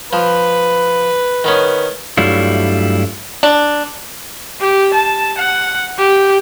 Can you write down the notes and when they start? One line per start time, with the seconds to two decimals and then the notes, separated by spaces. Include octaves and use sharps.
0.13 F3 B4
1.44 D#3 B3 C#4
2.17 G2 F#3 G3 A3 E4 F4
3.43 D4
4.61 G4
4.94 A5
5.38 F#5
5.99 G4